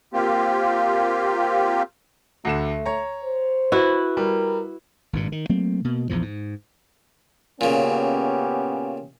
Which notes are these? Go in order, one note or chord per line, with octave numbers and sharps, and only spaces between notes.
A#3 C4 F4 G4
D2 D3 A3 E7
C#5 A#5
C5
E4 F#4 B4
G3 A#4
G#1 G2 A#2
D#3
F#3 A3 A#3 C4
B2 A#3
A#1 E2 A#2 F3
G#2
A#2 C#3 B3 C#4 G4